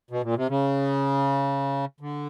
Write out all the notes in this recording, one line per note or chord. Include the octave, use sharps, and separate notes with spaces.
B2
A#2
C3
C#3
D3